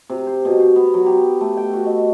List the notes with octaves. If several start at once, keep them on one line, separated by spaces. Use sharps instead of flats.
C3
C5
B2
C5
B3
F#3
G4
A3
G5
F#4
D#5